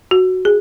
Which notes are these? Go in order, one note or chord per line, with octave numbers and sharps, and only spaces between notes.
F#4
G#4